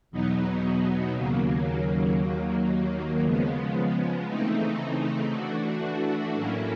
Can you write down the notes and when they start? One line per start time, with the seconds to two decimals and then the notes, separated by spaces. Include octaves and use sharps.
0.11 E2 B2 F#3 B3 D#4
1.15 D#2 C#3 F#3 A#3
2.20 D#2 D#3 F#3 A#3
3.24 C#3 F3 G#3 B3
4.27 C#3 E3 A3 C4 D#4
5.31 E3 A3 D4 F#4
6.35 A2 F#3 A#3 C#4 E4